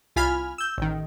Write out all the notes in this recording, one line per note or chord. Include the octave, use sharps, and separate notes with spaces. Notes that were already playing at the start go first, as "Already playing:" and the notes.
C2 F4 G#5 B5 F6
E6 G6
A1 D#3